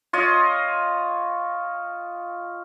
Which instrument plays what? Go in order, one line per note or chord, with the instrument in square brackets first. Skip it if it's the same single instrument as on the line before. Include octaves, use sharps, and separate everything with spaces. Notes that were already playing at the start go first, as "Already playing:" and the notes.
[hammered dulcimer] F4 C#5 D#5